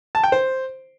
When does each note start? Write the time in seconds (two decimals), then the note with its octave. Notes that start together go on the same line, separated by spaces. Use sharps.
0.15 A5
0.23 G5
0.32 C5